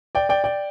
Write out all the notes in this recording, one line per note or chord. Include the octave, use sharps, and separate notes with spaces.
D5 G5
D5 G5
D5 G5